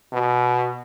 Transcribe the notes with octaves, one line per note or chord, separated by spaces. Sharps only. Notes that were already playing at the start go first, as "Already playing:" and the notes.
B2